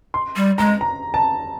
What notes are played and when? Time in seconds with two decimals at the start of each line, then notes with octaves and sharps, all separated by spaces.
0.14 C6
0.36 G3
0.58 G#3 A#5
0.81 A#5
1.14 A5